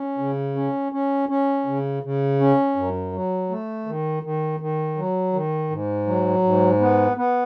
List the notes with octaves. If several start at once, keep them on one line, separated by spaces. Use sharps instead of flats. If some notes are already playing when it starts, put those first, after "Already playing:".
Already playing: C#4
C#3
C#4
C#4
C#4
C#3
C#3
C#4
F#2
F#3
A3
D#3
D#3
D#3
F#3
D#3
G#2
F#3
G#2
B3
B3